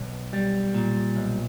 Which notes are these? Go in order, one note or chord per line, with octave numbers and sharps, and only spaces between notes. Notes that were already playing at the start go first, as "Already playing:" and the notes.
Already playing: B1
G3
A#2
B1